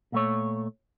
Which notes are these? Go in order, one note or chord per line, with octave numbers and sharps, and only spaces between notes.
A#2 A3 C#5